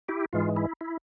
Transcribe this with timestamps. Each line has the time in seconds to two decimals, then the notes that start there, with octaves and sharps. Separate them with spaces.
0.08 E4 G4
0.33 G#2 E3 G#3 F4
0.56 E4
0.81 E4